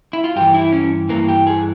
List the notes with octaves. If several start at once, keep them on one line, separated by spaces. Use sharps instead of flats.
E4
F4
G2 E3 G4
E4
C#4
G2 E3 A#3
G4
G#4